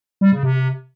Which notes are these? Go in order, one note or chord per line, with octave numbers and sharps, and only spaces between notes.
G3
C#3
C3